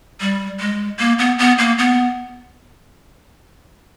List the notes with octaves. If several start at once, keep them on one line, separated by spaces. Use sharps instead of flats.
G3
G#3
A#3
B3
B3
A#3
B3